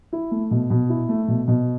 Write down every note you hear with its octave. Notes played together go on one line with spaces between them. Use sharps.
E4
A3
B2
B2
E4
A3
B2
B2